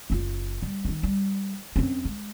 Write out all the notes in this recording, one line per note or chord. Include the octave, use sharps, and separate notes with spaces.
F#1 F4
G3
D#3 D#4
G3
F#2 C4
G#3